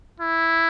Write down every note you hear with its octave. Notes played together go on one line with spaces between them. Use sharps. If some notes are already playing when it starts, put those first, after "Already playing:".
E4